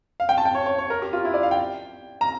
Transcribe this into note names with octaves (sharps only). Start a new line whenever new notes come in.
F5
G5
A5
G5
C#5
C#5
C#5
A#4
G4
F4
E4
D5
F5
G5
A#5